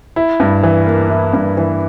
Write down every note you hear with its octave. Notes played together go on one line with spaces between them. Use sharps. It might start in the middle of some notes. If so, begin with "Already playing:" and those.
E4
G2
E3
A#3
E4
G2
E3